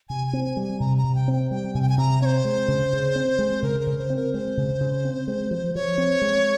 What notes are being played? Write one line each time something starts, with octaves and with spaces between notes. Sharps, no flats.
C3 G#5
G#5
C4
G#5
G3
G#5
C3 A#5
A#5
C3
G5
C4
G5
G3 G5
C3 G#5
G5
G#5
C3 A#5
C4 C5 C#5
G#3
C#3
C#3
C4
G#3
C#3 A#4
A#4
C#3
C5
C4
A#4
G#3 C5
C#3
C#3
C4
G#3
F3
F3 C#5
C4
G#3